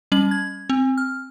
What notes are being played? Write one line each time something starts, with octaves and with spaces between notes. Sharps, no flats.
G3 C#4 F#7
G#6
C4
F6